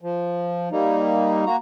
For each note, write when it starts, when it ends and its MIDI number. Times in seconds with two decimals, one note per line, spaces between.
0.02 0.69 53
0.72 1.45 55
0.72 1.45 58
0.72 1.45 63
1.46 1.56 58
1.46 1.56 66
1.46 1.56 82